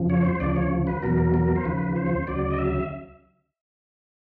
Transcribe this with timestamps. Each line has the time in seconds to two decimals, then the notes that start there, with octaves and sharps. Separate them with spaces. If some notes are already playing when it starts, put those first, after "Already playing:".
Already playing: F2 C#3 F3
0.10 C#5
0.25 C5
0.40 D2 C#3 F3 D5
0.56 C#5
0.87 B4
1.02 E2 B2 F#3 A#4
1.34 A#4
1.56 C5
1.65 D#2 C#3 F3 B4
1.96 C5
2.27 D2 C#3 F#3 D5
2.51 D#5
2.59 E5